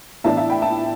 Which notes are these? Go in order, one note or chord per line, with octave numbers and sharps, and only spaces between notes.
A2 E3 B3 D4 E5 A5
E5 A5
G5 B5
E5 A5